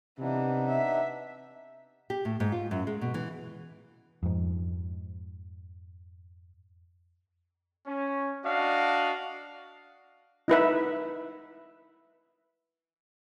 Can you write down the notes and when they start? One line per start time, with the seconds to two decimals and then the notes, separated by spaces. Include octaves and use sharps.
0.19 C3 E3 B3 D4 D#4
0.66 E5
2.10 G4
2.25 A2
2.40 G#2
2.52 F4
2.71 F#2
2.87 G#3
3.01 B2
3.14 E3
4.23 F2 G#2
7.86 C#4
8.44 D4 F#4 D#5 F5
10.48 D#4 E4 B4 E5